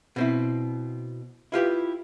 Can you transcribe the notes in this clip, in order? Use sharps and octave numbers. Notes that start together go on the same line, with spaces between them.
B2 C4 E4
E4 F4 G4 B4